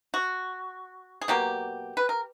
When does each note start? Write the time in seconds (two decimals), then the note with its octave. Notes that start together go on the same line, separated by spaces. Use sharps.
0.14 F#4
1.21 G#4
1.28 B2 F#3 A#3 G4
1.97 B4
2.09 A#4